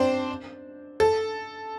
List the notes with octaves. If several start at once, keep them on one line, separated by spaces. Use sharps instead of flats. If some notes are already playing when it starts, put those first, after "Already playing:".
Already playing: C4 D4 C5
A4